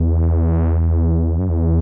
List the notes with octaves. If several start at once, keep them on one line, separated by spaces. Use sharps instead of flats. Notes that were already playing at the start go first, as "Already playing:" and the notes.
Already playing: E2
F#2
E2